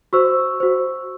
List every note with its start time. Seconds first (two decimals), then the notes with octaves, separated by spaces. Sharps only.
0.13 F#4 C5 C#6 E6
0.60 F#4 C5